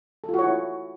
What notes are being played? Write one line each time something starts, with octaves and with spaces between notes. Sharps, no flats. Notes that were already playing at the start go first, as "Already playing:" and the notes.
A4
F4
F#4
C#5
E4